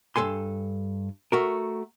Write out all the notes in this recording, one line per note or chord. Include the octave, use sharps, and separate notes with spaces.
G2 A3 A4 G#5 C6
A3 F#4 A#4